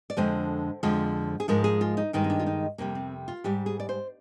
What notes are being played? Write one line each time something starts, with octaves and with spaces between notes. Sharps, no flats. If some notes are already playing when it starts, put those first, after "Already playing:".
D5
F2 D3 F3 G#3 C5
F2 D3 F3 G#3
G#4
G#2 F3 G#3 A#4
G#4
F4
D#4
G2 D#3 G#3 D#4
C4
D4
F4
D#4
F2 C3 G3 A#3
C4
F4
G#2 G3 G4
G#4
D5
C5